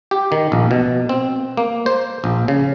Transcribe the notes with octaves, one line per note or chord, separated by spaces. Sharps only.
G4
D#3
A#1
B2
C4
A#3
C5
A#1
C#3